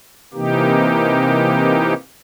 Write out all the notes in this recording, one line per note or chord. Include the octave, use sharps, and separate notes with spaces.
C3 E3 A#3 D#4 G4